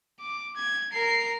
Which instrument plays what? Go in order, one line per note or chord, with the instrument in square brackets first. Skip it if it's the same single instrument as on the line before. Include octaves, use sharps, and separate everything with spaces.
[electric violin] D6
G#6
A#4 C7